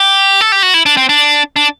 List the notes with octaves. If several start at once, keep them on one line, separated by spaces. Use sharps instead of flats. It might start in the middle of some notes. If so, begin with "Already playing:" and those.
Already playing: G4
A4
G4
F#4
E4
D4
C4
D4
D4